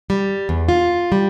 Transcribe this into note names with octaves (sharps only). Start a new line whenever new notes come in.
G3
E2
F4
G3